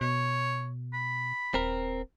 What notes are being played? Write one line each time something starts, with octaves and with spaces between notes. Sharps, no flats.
B2 C#5
B5
D#1 C4 A#4